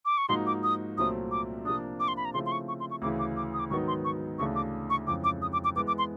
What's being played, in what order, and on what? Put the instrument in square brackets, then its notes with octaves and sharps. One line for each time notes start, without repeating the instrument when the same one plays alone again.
[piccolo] D6
C#6
[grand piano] G#2 F3 A#3 D#4 F#4 [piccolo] C6
[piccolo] D6
D#6
[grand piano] C2 A#2 F#3 A3 C4 [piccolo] D#6
[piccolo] D6
[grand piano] C3 F3 A#3 D4 [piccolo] D#6
[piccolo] D6
C6
B5
A#5
[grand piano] C#3 F3 A3 C4 E4 [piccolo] C6
[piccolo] C6
C#6
C#6
C6
C#6
[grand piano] D2 C#3 E3 [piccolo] D6
[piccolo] D6
D6
D#6
D6
[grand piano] G#2 D#3 F#3 B3 D#4 [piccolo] C#6
[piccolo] C6
C#6
[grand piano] D2 C#3 E3 A3 D4 [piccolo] C#6
[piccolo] D6
C#6
[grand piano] F2 C#3 E3 G#3 C#4 [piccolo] D6
[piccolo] D6
D#6
D6
D6
[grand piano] E3 G#3 B3 [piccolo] D6
[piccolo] D6
C6